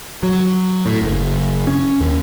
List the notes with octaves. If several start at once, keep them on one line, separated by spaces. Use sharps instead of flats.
F#3
A2
F#1
C#4
D#2